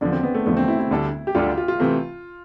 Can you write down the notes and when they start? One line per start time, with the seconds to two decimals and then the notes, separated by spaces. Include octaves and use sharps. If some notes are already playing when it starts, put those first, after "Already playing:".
0.01 E2 D3 F3 D4
0.12 C4
0.23 B3
0.34 A3
0.46 E2 D3 F3 A3
0.57 C4
0.68 E4
0.79 E4
0.91 D2 D3 G3 D4 A4
1.27 G4
1.35 D2 D3 G3 D4 F4 A4
1.58 F4
1.68 F4
1.80 C3 E3 A3 C4